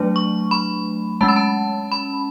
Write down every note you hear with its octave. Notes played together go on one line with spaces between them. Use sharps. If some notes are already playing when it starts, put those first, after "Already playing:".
Already playing: F#3 A3 D4
C#6
B5
G#3 C#4 A5
B5
A5
B5